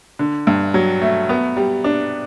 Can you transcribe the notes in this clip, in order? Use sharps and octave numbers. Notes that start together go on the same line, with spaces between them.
D3
G2
F#3
A3
B3
G3
D4